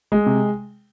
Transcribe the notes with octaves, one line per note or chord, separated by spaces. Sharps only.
G#3
C3